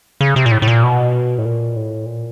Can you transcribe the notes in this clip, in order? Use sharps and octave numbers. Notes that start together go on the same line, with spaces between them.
C#3
C3
A#2
A2
A2
A#2
B2
A2
A#2
A2
A#2